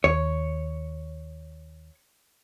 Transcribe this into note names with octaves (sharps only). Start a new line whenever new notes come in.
D#2 C#5